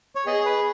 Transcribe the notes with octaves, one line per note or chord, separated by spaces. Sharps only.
C#5
B3 G#4 D#5
B4